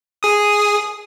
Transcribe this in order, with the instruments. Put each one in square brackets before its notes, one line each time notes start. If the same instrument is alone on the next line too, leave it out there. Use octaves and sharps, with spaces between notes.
[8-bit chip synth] G#4 D#6